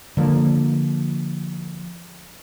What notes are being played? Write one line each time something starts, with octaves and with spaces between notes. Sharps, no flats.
D3 F3 G#3 A#3